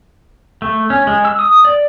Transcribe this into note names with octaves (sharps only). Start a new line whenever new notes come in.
A3
C#4
G#3
E6
D#6
D5